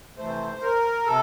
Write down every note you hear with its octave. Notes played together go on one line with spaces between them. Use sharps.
C3 E3 A3 C5
A#4
C3 A4